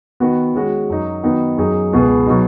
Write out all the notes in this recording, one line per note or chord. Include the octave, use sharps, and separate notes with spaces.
D#3 B3 F#4
D#3 G#3 C#4 F#4
F#2 F#3 D#4
D#3 B3 D#4 F#4
F#2 F#3 D#4 G#4
C#2 B2 B3 G#4
B2 F#3 D#4 F#4